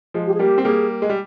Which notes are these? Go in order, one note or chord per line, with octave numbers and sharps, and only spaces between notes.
F3 G#3
G4
G#4
G3 A#3 G4
C4
G3 A#3 G#4
G#3
G3